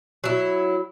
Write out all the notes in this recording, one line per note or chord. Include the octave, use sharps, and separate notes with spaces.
F#3 E4